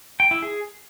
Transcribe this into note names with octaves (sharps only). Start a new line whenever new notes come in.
G5
E4
G#4